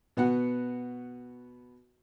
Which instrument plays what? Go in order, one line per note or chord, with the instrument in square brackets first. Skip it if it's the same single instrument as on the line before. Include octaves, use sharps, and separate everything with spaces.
[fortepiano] B2 B3 F#4 F#5